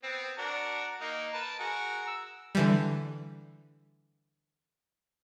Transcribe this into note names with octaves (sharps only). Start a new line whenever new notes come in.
B3 C4
D4 F#4 A#4
A#3 D#4
A#4 B4 A5
F#4 G#4 A#4
E6
D3 E3 G3